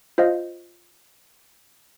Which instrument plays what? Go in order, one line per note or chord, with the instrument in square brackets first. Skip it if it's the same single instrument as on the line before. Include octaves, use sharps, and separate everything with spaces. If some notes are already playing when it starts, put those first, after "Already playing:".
[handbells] F4 C5 D#5 F5